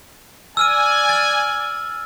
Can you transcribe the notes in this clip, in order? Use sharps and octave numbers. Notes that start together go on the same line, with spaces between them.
D5 G#5 E6 F6 D#7
F6 A6